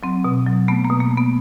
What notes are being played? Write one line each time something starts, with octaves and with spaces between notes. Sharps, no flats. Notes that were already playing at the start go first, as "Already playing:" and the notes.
F#3 C4
B2
F#3
A3 B3
A#3
B2
A#3
A3
B3